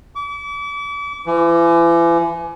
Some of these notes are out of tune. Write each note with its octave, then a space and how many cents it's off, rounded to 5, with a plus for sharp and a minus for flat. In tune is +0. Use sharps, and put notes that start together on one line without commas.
D6 -40
E3 +40